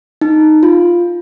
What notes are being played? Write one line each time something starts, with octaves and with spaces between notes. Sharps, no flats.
D#4
F4